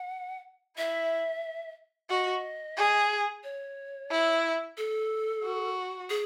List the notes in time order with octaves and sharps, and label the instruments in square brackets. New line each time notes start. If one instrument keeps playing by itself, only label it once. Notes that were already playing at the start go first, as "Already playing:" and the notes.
Already playing: [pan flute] F#5
[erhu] E4 [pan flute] E5
[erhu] F#4 [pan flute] D#5
[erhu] G#4
[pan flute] C#5
[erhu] E4
[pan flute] A4
[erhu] F#4
[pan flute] G#4